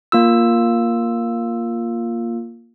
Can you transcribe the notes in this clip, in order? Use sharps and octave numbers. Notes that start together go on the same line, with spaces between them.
A#3 F4 E6